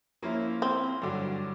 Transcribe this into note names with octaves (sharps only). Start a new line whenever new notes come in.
F3 A#3 C#4 E4
C4
G2 D3 F#3